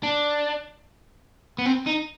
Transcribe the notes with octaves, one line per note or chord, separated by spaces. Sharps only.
D4
B3
C4
D#4